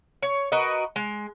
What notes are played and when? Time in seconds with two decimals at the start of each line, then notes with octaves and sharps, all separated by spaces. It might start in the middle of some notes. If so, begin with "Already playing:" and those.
0.22 C#5
0.52 F#4 A#4 B4 D#5
0.96 G#3